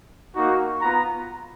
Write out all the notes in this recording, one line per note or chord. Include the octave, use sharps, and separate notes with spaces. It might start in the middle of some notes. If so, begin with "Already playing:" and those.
A#3 D#4 F#4
B3 F4 F#5 A#5